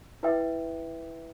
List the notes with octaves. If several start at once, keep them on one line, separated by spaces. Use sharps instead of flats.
E4 B4 E5 G5